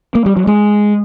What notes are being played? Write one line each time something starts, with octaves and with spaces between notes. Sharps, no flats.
A#3
G3
F#3
G#3